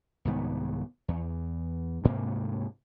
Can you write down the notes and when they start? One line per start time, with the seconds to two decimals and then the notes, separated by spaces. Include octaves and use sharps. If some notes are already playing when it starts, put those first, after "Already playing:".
0.25 C2 G#2 D#3 B3
1.08 E2
2.04 D2 G#2 C3 A#3